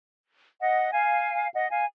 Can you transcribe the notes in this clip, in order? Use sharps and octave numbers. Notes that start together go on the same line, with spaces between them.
D#5 F#5
F5 G#5
D#5 F#5
F5 G#5